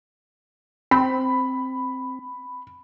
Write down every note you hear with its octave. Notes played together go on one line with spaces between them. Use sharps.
C4 B5